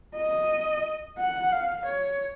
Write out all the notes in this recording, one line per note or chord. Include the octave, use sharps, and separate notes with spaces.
D#5
F#5
F5
C#5